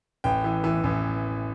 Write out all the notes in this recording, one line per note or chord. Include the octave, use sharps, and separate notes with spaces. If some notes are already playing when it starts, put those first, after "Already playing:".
A1 G5
E3
E3
A1